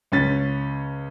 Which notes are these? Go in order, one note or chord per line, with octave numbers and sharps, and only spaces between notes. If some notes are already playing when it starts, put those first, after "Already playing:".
C#2 C#4 A6 B6